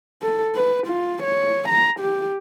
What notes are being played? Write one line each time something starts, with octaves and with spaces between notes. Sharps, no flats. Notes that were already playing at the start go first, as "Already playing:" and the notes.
A4
B4
F4
C#5
A#5
G4